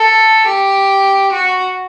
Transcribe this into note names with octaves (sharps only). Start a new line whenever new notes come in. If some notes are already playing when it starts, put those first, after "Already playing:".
Already playing: A4
G4
F#4